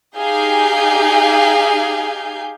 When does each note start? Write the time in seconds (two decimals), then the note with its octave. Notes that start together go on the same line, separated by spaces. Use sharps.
0.17 D#4 G4 G#4 F5 G#5 G6